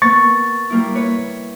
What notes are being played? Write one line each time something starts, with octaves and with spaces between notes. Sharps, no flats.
A#3 B3 C#6 A6
G3 A#3 E4
B4 C#5